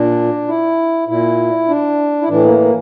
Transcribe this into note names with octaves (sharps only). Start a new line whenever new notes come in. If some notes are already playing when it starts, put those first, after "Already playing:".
Already playing: A#2 D4
E4
A#2 E4
D4
E4
A2 E3 D4
A#3
A#3